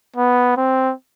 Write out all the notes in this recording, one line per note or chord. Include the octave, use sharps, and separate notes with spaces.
B3
C4